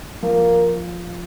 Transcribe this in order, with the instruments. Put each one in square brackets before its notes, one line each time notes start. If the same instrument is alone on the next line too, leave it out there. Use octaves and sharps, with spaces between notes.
[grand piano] F3 [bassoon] A#3